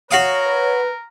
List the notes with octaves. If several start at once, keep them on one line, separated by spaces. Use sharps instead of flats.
F#4 A#4 C#5 F5 D#6
B4